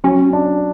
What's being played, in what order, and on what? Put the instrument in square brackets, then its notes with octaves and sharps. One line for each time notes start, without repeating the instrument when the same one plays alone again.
[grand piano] F#3 [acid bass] C#4
[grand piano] D4